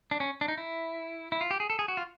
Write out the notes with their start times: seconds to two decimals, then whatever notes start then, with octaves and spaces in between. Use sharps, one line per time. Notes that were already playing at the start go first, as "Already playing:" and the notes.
0.11 D4
0.20 C#4
0.41 D4
0.48 D#4
0.58 E4
1.32 E4
1.41 F4
1.51 G4
1.60 G#4
1.70 A4
1.79 G#4
1.88 F#4
1.97 F4